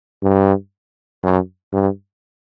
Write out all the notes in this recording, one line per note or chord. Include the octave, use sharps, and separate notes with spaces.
G2
F#2
G2